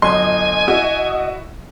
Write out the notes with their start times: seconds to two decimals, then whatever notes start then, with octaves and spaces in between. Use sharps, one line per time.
0.02 G1 F#3 D#5 G#5 C6
0.67 E4 F#4